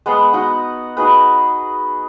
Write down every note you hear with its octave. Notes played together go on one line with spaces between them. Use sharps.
G#3 B3 F#5 C6
B3 D#4 F#4 F#5
D#4 F#4 G#4 B4